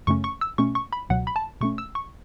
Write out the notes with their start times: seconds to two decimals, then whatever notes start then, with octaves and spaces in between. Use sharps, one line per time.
0.07 F#2 C#3 A3 C#4 C#6
0.24 C#6
0.41 E6
0.58 B2 A3 C#4 C#6
0.75 C#6
0.93 B5
1.10 C#2 B2 F#3 F#5
1.27 B5
1.36 A5
1.61 B2 A3 C#4 C#6
1.78 E6
1.95 C#6